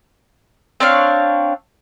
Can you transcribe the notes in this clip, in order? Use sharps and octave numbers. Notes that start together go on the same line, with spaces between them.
C4 D4 C#5 F5